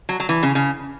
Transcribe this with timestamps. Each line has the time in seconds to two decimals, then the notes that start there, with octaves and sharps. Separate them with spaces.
0.09 F#3
0.20 F#3
0.29 E3
0.43 C#3
0.55 C#3